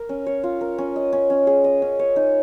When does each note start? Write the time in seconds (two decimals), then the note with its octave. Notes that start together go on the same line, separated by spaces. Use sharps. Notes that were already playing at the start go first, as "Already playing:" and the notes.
Already playing: A#4
0.09 C#4
0.27 C#5
0.44 F4
0.61 A#4
0.78 C#4
0.96 D#5
1.13 C#4
1.30 C#4
1.47 G#4
1.64 D#5
1.82 C#4
1.99 C#5
2.16 D#4